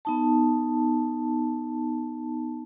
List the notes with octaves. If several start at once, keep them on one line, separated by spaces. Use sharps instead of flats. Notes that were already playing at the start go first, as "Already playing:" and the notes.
B3 D#4 A5